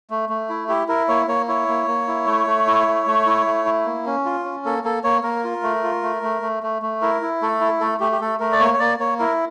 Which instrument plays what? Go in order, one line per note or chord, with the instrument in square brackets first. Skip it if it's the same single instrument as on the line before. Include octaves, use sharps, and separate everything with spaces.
[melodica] A3
A3
E4
E4 G4
E4 A#4
A#3 C#5
A#3 C#5
E4 C#5
A#3
A#3
E4
A3
A3
E4
A3
A3
E4
A3
E4
A#3
C#4
F4
C#4
A#3 A4
A#3 A4
A#3 C#5
A#3 A#4
F4
A3
F4
A3
A3
A3
A3
A3
E4 A#4
E4
A3 A4
E4
A3 A4
A3 G4
G4
A3 A4
A3 A#4
D5
A#3 C#5
C#5
A#3 D5
A#3 C#5
E4 A#4